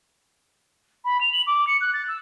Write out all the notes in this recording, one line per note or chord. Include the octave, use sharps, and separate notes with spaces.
B5
F7
F#7
D6
C#7
F#6
A6
E6